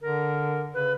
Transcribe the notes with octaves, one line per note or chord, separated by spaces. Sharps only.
D3 A#4
C#3 B4